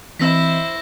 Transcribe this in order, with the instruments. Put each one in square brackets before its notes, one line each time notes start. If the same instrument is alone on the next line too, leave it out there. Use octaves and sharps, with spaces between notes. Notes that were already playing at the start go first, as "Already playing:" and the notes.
[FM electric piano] E3 C4 D#5 [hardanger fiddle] E4 C5 [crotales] E6 A#6 B6